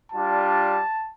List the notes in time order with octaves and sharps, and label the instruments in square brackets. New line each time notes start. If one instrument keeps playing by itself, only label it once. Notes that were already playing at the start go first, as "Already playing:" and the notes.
[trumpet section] G3 D4 F4 A5